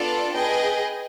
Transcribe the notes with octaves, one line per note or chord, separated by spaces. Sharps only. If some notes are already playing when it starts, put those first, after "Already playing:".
Already playing: B3 D4 F4 A4 D5
G#4 B4 D#5 G5